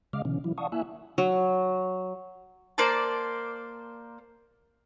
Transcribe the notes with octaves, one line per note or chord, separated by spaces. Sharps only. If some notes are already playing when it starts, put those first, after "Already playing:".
C#3 G#3 D#5 F5 D6 F6
B2 D3 E3 C#4
E3 F#3 E4
D5 F5 F#5 A5 C#6 D#6
A#3 E4 E5 G#5 E6 F#6
F#3
A#3 C5 D5 A5